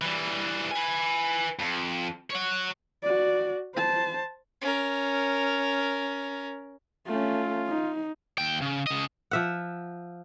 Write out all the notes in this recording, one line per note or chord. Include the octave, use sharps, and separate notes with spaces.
E3 G3
B4 G#5
F2
C#5 F#5
F#4 D5
C5 A5
C#4 A#4
A3 C#4 F4
D#4
D#2 G5
C#3
C#3 D#5
F3 E5 F#5